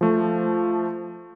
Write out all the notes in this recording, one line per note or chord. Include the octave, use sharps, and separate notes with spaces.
F3 A3